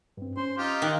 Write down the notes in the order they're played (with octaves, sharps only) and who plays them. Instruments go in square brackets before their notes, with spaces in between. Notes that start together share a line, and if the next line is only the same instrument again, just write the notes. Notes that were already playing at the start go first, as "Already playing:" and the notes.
[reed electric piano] G2 C4
[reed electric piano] C#4 [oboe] C5
[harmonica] D#4 F4 [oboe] G4
[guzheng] D#3 [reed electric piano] F5 G5 F#6